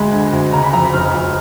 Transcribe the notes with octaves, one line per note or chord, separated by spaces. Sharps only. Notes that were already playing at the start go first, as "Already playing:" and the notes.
Already playing: D2 G#3 B5
D3
D2
C#3 A#5
B5
F2 A#5
B5
F1 F6
F2